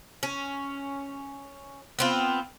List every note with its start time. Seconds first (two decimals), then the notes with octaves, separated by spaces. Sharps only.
0.23 C#4
1.99 B3 C4 F4